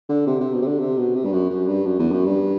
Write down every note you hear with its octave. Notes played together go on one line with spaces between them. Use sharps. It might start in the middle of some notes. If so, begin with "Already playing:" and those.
D3
C3
C3
B2
C3
D3
C3
B2
C3
G2
F#2
F#2
G2
F#2
E2
F#2
G2